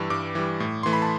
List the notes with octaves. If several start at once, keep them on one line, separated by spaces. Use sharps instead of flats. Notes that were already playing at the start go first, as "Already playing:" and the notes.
Already playing: G2 E3 G3 E6
G2 D6
E3 G3
A2
E3 A3 C6
B5
A5